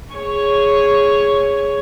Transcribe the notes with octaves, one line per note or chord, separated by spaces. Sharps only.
G#4 C#5